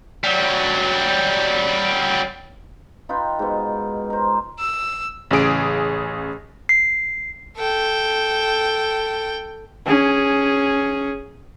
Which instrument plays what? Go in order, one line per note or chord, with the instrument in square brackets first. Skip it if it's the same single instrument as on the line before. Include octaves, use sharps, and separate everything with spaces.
[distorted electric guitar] F#3 G3
[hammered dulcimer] D#4 F4 B4 G5
G#2 B2
A#4 C5
[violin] E6
[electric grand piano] A1 C#3 G#4 D7
[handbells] C7
[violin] A4 G5
[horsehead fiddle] C#4 G#4